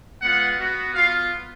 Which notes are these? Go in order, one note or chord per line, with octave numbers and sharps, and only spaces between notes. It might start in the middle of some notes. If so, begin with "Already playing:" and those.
G#3 B3 F4 F#5
B3 F#4
B3 F4 F5